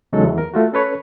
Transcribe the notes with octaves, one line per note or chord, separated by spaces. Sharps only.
E2 C#3 F#3 G#3 D#4 A4
E2
A#4
A3 F4 F#4
C#4 A4 B4 C#5